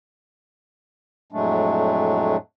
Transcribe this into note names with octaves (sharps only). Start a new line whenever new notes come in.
F2 A2 F#3 G#3 A3 D4